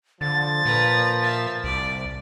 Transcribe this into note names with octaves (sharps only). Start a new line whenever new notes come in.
D3 F3 A6
A#2 B4 A#5
E5 F5
C2 D5